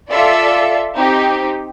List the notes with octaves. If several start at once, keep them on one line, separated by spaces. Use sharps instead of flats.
F4 A4 D5 E5
C4 D#4 G4